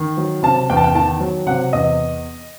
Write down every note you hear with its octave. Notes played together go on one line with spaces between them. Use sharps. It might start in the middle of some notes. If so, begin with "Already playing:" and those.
Already playing: D#3
F#3
C3 A5
E2 G5
A5
G5
D#3 A5
F#3
C3 F#5
E2 D#5